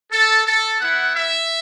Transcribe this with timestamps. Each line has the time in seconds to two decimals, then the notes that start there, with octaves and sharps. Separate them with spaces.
0.12 A4
0.46 A4
0.81 B3 E4 F#5
1.15 E5